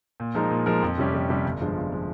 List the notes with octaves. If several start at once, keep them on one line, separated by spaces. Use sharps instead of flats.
A#2
F3 G#3 D#4 A#4
A#2
F3 G#3 D#4 A#4
F2
C3 G3 C#4 G4
F2
C3 G3 C#4 G4
G1
G2 F3 G#3
G1
F3 G#3